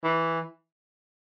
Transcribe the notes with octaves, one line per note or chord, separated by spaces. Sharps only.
E3